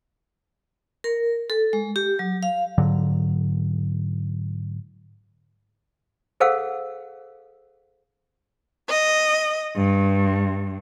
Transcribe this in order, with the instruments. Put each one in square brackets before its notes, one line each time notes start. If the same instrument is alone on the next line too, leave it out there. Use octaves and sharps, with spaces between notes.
[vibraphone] A#4
A4
G#3
G4
F#3
F5
[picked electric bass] G#2 D3 F#3
[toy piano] G#4 A4 C5 F5 F#5 E6
[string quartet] D#5
G2